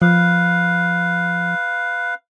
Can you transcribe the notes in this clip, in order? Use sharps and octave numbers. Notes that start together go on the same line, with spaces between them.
F3 B4 F5